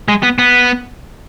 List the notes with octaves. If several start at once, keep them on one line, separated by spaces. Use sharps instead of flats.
G#3
B3
B3